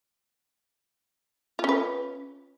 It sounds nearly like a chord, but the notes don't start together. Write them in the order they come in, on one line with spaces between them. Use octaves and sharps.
F4 C#4 B4